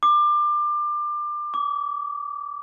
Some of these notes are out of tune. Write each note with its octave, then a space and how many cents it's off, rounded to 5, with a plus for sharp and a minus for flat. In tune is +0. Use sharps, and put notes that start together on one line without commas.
D6 +25
D6 -30